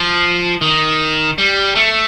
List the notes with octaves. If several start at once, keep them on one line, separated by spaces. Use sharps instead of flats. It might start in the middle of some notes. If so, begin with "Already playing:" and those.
Already playing: F3
D#3
G3
A3